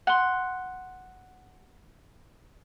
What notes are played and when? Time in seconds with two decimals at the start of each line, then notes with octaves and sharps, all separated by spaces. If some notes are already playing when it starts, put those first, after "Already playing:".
0.07 F#5 C6